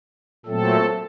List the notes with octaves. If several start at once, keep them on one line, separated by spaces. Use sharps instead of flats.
A#2 F#3 A3 C4 A4